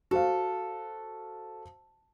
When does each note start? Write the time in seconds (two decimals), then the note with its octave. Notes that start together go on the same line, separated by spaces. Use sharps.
0.11 F#4 A4 C5 F5